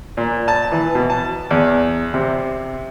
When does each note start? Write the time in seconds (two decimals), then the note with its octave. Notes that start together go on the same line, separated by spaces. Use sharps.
0.17 A#2
0.48 A5
0.72 E3
0.95 B2
1.10 A5
1.51 E2
2.14 C3